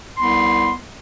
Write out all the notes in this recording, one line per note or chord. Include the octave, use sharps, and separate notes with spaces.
C2 B3 C6